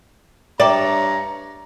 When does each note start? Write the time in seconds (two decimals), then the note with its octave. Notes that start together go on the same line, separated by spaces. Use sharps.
0.60 G2 C#5 D5 E5 G5 A#5 D6